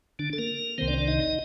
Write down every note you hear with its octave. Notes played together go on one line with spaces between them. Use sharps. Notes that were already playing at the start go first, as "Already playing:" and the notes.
D3 D4
A4
A#3 A#4
C2 C3 D#3 C4 C5
D4 D5
C5
D4 D5
D#4 D#5